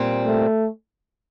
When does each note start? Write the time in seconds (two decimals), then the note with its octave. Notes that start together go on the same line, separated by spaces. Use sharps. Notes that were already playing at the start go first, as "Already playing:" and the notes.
Already playing: A#2 G3 C4
0.26 A3